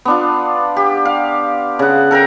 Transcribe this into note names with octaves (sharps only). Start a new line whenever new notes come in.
B3 D4 F4
G4
F5
C#3 F#5
A4 A#4 G5 A#5